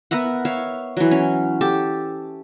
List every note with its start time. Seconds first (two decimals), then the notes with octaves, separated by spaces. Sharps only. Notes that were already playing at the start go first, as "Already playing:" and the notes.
0.11 B3 A#4 E5 F#5
0.45 C#5 E5 F5
0.97 E3 F#3
1.11 C#4
1.61 G4 A4 A5